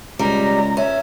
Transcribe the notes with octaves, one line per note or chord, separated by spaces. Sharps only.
C#2 G3 A#5
C#4 E5